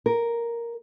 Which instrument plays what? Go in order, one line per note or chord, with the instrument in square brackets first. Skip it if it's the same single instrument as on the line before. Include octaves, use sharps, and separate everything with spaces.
[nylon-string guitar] A#4